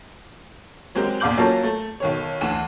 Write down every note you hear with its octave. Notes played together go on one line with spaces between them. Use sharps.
F#3 G#3 C4 G4 A#4
A#1 E2 F5 D6 G6 F#7
F#3 A#3 C#4 F4 A4 C#5
A3
B1 D#3 C#5
D2 E3 E7